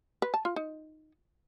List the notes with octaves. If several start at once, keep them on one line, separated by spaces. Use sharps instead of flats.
B4
A5
F4
D#4